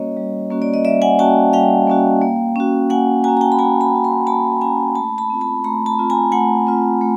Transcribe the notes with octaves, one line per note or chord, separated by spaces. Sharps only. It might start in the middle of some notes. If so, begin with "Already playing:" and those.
Already playing: G3 A#3 C#4 F#4 C#5 D#5
G3
A#3 C#4 F#4
D5
D#5
G3 D5 E5
F#5 G#5
A#3 C#4 F#4 G5 A5
G3 F5 G5
A#3 C#4 F#4
A#3
C#4 F#4
A#3 F#5 G#5
C#4 F#4 G#5 A#5
A#5
G5 A5
B5
A#3 G#5 A#5
A5 B5
C#4 F#4
A#5 C6
A#3 A5 B5
C#4 F#4 G#5 A#5
A3 A5 B5
A5 B5
C4 F4
A5 B5
A3 A#5 C6
A5 B5
C4 F4
G#5 A#5
A3 F#5 G#5
C4 F4
A3